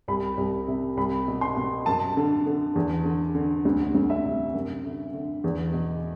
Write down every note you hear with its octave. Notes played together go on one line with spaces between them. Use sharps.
C2 B5
C2
C3
C2 B5
B2
C6
B2
F#2 A5
D3
D3
E2
D3
D3
D2
D2
E5
C3
F#2
D3
D3
E2
B2